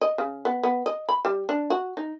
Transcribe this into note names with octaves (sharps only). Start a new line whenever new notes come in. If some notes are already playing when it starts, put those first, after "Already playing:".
D#5
C#3
B3
B3
D#5
B5
G3
D4
F#4
D#4